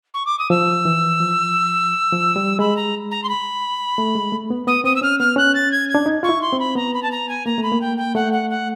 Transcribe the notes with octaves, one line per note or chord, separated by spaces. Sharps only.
C#6
D6
D#6
F3 E6
E3
F3
F3
G3
G#3 B5
A#5
A#5
C6
B5
A3
G#3
A3
B3
B3 D#6
C4 D#6
E6
C#4 F6
B3 F6
C#4 F#6
A6
G#6
G#6
D4
D#4
F4 C#6
E4
C6
C4
B5
B3 A#5
B5
A5
A#5
G#5
A#3 A#5
A3 B5
A#3
G5
G5
A3 F#5
F#5
F#5